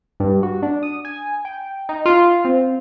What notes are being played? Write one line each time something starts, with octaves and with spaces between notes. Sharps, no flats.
G2
F#4
D4
D#6
G#5
G5
D#4
F4
C4